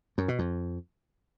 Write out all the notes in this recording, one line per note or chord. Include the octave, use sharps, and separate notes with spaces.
F#2
B2
F2